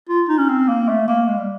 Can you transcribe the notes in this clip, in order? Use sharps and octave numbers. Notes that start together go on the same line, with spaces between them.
F4
D#4
C#4
C4
A#3
A3
A#3
G#3
G3